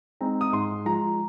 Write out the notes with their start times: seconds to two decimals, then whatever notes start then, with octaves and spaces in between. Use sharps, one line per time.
0.21 G#3 C4 D#4 A#5
0.41 D#6
0.53 G#2 C6
0.85 F3 G#3 A#5